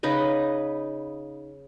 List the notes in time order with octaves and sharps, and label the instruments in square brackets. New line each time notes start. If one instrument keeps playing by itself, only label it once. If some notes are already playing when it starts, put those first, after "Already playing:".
[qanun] C#3 D#4 B4 D#5